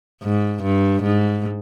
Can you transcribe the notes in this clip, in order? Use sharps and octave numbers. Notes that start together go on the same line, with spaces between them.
G#2
G2
G#2